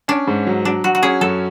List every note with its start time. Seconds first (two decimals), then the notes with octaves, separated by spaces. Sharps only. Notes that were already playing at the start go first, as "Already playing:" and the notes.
0.08 C#4 D4
0.27 G#2
0.47 F#3
0.65 F#3 D4
0.84 F#3 F#4
0.95 F#4
1.02 C#4 G#4
1.21 F#2 A4